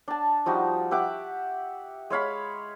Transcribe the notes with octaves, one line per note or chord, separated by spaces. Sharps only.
D4 A5
F3 G3 D#4 F#4
G4 E5 F#5 D6
G#3 C#5 F5 B5